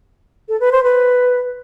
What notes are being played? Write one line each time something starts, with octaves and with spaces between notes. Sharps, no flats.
A4
B4
C5
B4